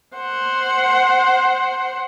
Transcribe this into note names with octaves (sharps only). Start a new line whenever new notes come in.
C5 F#5